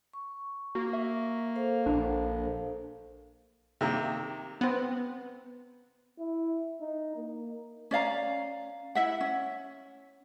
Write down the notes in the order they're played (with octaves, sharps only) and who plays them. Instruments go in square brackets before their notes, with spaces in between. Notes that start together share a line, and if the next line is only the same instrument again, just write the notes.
[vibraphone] C#6
[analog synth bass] A#3 [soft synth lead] F#4
[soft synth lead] E5
[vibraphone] A4 C5 F5
[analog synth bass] A#1 [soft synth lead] D4
[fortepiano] C3 D#3 A#3
[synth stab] B3 C4
[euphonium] E4
D#4
A#3
[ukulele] C#4 D5 F5 A#5
E4 E5 F#5
C#4